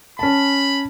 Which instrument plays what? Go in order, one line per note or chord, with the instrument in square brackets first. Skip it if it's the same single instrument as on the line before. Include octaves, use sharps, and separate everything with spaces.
[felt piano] C#4 A5 [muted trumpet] B5